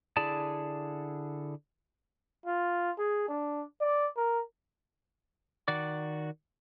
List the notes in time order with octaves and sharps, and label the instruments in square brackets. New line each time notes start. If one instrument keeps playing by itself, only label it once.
[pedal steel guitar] D3 E4 G#4 D5 A5
[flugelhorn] F4
G#4
D4
D5
A#4
[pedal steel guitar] D#3 F#4 D5 D6